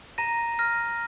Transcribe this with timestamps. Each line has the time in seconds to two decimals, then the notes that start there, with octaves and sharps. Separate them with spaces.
0.18 A#5 A#6 D#7
0.59 F6 A#6